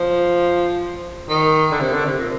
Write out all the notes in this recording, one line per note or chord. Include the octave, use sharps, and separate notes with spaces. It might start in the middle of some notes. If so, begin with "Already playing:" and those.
Already playing: F3
D#3
D3
C3
D3
C3
A#2